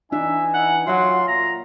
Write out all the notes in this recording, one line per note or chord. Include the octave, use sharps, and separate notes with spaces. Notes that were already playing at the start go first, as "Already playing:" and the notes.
E3 D4 D#4 E5 G#5
F#5
F#3 F4 E5 F#5 C6
A#2 A#5